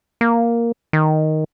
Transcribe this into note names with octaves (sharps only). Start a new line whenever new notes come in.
A#3
D#3